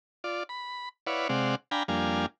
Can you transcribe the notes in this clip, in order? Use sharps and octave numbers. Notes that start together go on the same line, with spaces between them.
F4 D5
B5
E4 B4 C#5 D5 F5 F#5
C3 G#3 C4 D5 F5 F#5
D4 F5 G5 G#5 A#5 B5
F2 G3 A#3 D4 F5 G#5